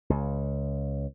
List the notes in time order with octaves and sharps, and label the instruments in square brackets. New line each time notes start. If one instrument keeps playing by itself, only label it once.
[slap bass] C#2